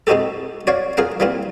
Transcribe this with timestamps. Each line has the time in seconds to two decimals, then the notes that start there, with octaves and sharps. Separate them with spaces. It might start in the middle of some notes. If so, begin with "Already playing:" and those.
0.07 G#3 C4 D#4 F#4 G4 A4
0.67 F#4 C#5 D5 F5
0.97 F4 G#4 A#4 F5 F#5
1.20 E3 G3 A#3 C4 F4